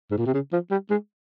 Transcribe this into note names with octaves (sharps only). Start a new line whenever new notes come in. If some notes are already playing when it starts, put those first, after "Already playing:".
G#2
A#2
C3
C#3
F3
G3
G#3